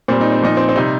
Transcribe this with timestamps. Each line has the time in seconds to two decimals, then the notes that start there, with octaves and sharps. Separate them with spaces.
0.08 A#2 G3 C4
0.21 D#4
0.32 C4
0.41 A#2 F3 D#4
0.57 C4
0.69 C4
0.76 C3 G3 D#4